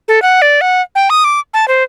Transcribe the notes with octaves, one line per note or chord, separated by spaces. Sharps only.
A4
F#5
D5
F#5
G5
D#6
D6
A5
C5